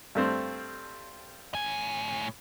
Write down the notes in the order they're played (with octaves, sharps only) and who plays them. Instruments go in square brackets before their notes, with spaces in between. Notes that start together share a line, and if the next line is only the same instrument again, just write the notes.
[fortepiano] G2 A3 C4
[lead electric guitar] A2 G#5